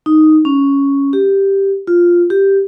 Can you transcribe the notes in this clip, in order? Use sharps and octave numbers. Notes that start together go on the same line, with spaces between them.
D#4
C#4
G4
F4
G4